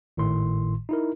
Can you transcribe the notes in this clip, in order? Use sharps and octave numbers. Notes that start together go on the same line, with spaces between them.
G#1 A2 D#3 C6
D#4 E4 A#4